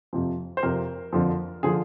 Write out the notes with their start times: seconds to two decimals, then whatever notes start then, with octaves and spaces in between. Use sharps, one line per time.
0.13 F2 C3 F3
0.57 C5
0.63 F2 C3 F3 A#4
1.13 F2 D3 F3
1.63 D3 F3 G#4